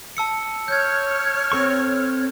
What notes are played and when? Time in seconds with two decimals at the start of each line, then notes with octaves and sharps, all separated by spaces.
0.17 A5 E6 C#7
0.68 C#5 F6 G6 G#6
1.52 C4 A4 C#6